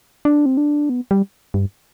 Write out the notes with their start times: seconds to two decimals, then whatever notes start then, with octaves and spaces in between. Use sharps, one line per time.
0.25 D4
0.46 C4
0.57 D4
0.89 B3
1.11 G3
1.54 G2